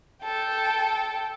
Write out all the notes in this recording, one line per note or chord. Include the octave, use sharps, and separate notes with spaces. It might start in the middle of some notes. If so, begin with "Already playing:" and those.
A4 G5